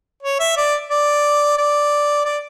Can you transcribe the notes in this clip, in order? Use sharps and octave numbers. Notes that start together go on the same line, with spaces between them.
C#5
E5
D5
D5
D5
D5